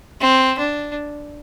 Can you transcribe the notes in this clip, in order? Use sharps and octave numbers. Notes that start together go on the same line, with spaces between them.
C4
D4